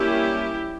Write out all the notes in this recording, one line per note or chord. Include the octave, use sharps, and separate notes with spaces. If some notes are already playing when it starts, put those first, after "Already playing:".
Already playing: G3 A#3 C#4 E4 G4